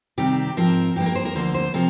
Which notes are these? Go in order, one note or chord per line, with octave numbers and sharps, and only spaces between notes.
C3 D#3 G3 C4 G4
G#2 F3 C4 A#4
G2 F3 A#3 G4
A#4
C5
A#4
D2 D3 F3 A#3 C5
C5
C3 F3 A#4